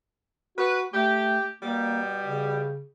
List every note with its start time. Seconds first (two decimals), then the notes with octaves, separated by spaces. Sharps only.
0.58 F#4 B4
0.94 A3 G4
1.63 B2 G3 A#3
2.26 C#3